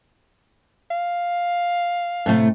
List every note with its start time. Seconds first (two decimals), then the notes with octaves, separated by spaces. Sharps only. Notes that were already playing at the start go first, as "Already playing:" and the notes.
0.91 F5
2.26 A2 C3 A3